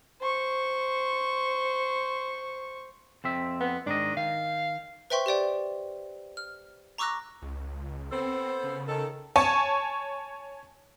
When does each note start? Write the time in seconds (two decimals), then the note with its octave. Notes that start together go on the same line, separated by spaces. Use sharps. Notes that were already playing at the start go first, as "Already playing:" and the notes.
0.21 C5 C#6
3.24 F2 C4 E5
3.60 B3
3.86 G#2 D#3 D4 D#5
4.17 D#3 F5
5.10 B4 C5 E5 G5 C6 C#6
5.26 G4 C5 D5 G5
6.37 F6
6.98 A#5 C#6 D6 E6 F#6 A#6
7.42 C#2
8.12 B3 C4 A4 C5
8.63 C#3
8.88 D#3 A4
9.36 C#5 G#5 A5 C#6